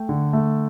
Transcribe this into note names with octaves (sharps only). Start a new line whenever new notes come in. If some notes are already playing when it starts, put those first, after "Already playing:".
Already playing: A3 G5
D3
A3